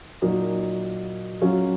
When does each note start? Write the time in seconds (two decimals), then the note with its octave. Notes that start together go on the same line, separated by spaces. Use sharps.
0.22 A#2 F#3 A#3 D#4
1.41 F#3 C#4 F4